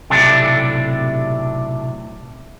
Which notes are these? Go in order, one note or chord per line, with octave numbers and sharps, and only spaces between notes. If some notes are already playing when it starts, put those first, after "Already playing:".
B1 A2 C3 D4